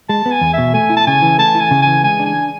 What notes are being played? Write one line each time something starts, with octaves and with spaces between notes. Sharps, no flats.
G#3 A5
B3
G#5
E2
B2 E5
A3 G#5
E4
A5
C#3 G#5
E3
A3 A5
E4 G#5
C#3
E3 G#5
G#3 G#5
D4
G#5